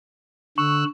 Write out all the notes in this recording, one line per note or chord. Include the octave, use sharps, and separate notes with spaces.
D3 C#6 E6 F#6